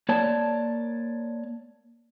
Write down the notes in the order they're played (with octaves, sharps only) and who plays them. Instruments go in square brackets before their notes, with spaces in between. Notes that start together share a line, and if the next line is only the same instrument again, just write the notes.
[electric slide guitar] A#3 C#5 D5 A5